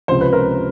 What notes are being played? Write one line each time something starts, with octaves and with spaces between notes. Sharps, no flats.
C#2 C3 F3 C5
B4
A#4